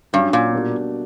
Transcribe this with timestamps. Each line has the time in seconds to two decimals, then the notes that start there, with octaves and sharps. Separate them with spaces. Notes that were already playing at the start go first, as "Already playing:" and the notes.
0.13 G2 F#3 C#4 F#4
0.33 A#2
0.53 B2 G3 A#3 D4 F#4